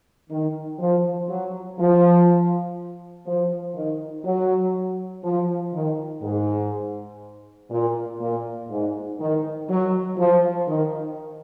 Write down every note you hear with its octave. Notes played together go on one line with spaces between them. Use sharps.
D#3
F3
F#3
F3
F3
D#3
F#3
F3
D#3
G#2
A#2
A#2
G#2
D#3
F#3
F3
D#3